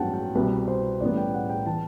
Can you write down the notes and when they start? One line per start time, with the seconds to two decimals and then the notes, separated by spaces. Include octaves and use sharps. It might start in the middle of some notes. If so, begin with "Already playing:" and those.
Already playing: A1 G2 F#3 B3 F#5 G5 A5
0.13 G5
0.35 C2 B2 G3 B3 B4
0.68 C5
1.00 A1 A2 G3 B3 D5
1.17 G5
1.34 F#5
1.50 G5
1.66 E3 A5